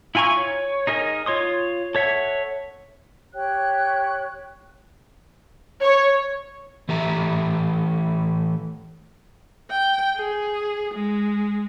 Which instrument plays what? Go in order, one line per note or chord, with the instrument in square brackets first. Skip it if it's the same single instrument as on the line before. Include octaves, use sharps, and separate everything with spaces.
[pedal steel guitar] E4 F4 G#5 A#5 C#6
C#5
D#4 G#4 A#4 D#5 G#5
F4 C#5 C6 D#6
A4 C#5 E5 F#5
[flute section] G4 C#5 G5 F#6
[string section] C#5
[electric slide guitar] E3 A3 G4 E5 A#5
[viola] G5
G#4
G#3